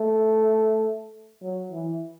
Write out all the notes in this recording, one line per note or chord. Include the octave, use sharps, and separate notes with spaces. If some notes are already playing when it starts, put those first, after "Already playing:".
Already playing: A3
F#3
E3